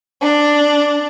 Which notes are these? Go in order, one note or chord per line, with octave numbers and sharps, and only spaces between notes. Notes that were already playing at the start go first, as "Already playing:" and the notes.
D4